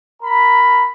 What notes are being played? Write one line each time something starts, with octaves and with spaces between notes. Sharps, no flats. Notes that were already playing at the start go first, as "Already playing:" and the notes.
A#4 A#5 B5